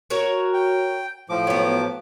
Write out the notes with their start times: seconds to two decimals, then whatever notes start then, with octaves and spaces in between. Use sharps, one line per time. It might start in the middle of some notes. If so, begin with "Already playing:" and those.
0.10 F#4 A#4 C#5
0.54 G5
1.29 A2 F3 D6
1.47 F#3 B3